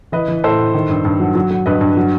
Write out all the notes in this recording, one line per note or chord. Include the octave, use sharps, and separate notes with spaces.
E3 B4 D#5
E3
A2 A4 C5
A2
D#3
G2
G2
F#3
F#3
F#3
G2 B4 D#5
G2
F#3